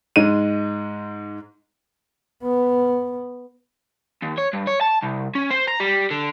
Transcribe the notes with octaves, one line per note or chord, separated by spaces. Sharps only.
G#2 G#3 D#7
B3
D#2
C#5
G2
C#5
A5
C2
C#4
C5
A#5
G3
D3